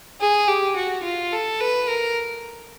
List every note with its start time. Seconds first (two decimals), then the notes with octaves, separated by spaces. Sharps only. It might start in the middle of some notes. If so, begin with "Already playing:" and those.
0.20 G#4
0.48 G4
0.76 F#4
1.04 F4
1.32 A4
1.60 B4
1.88 A#4